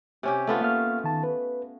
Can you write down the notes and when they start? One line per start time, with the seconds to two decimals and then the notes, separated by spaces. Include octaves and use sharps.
0.23 C3 C#4 G4
0.47 A3 B3 F4
0.61 A#3 F5 F6
1.04 D#3 A5
1.23 B4